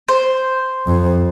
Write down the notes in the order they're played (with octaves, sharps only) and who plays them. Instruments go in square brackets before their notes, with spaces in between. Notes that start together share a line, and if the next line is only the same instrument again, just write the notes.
[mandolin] C5
[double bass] F2